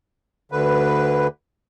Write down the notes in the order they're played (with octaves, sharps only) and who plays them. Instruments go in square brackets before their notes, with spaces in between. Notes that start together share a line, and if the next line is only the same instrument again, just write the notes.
[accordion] D2 D3 B4